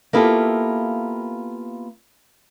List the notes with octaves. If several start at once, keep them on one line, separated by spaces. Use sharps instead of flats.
A#3 B3 E4 F4 G4 A4